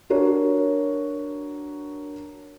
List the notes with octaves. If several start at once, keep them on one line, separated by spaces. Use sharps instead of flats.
D4 F#4 A#4 C#5